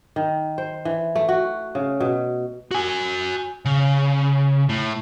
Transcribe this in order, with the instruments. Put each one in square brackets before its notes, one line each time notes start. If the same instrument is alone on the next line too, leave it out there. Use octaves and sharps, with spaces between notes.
[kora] D#3
C5
E3
A3
F#4
C#3
B2
[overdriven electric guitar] F#4 G#5
C#3
A2